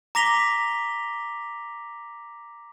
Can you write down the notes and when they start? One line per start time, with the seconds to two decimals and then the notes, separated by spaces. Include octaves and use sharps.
0.15 A#5 D6 A#6 B6 F7 G7